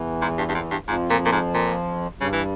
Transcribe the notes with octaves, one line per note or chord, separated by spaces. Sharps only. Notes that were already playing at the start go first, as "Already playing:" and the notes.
Already playing: E2 E3
G#2
G2
G2
F2
G2
F2 G#2 F3
A#2
A#2
G#2
A#2
G2 C#3 G3
E3